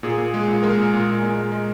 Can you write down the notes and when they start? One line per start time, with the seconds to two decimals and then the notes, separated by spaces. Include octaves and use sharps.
0.03 A#2 G#4
0.18 A#2
0.34 G#3
0.48 A#2
0.63 G#3 A#4
0.77 A#2
0.94 A#2
1.07 A#2
1.23 A#2
1.37 G#3
1.52 G#3